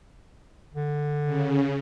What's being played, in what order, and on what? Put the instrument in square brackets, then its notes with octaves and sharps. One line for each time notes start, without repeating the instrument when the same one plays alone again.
[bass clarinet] D3
[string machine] C#3